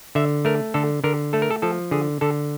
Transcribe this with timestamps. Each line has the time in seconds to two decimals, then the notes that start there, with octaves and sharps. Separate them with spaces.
0.15 D3 E5
0.45 A3 A#4
0.74 D3 A4
1.04 D3 A#4
1.33 A3 A4
1.42 A#4
1.50 A4
1.62 F3 A4
1.91 D3 G#4
2.21 D3 A4